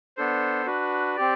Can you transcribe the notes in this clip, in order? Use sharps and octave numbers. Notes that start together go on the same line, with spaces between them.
B3 D4 A4 C5
D4 F#4 B4
C4 G4 D5